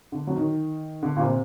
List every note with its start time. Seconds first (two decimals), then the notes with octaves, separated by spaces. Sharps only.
0.12 D3
0.27 F#3
0.36 D#3
1.03 D3
1.17 A#2
1.21 C3